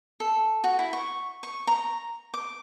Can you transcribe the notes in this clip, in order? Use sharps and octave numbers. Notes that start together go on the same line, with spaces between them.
A4
F#4
E4
C#6
C#6
A#5
D6